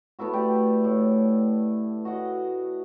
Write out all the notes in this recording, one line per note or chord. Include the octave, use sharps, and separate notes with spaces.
A3 B3 E4 F#4
G4 D5
A2
F#4 D#5 F#5